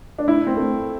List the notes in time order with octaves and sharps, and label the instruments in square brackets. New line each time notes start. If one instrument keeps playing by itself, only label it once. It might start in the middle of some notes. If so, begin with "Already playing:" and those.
[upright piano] D4
E4
C4
A3